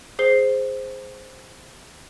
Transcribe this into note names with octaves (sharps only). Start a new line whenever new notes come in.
G#4 C5 C7 G7